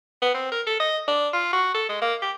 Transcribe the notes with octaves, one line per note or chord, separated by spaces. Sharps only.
B3
C4
A#4
A4
D#5
D4
F4
F#4
A4
G#3
A#3
G4